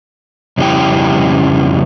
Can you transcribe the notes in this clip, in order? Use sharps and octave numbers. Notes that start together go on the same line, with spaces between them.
F2 C#3 G3 C#4 E4 G5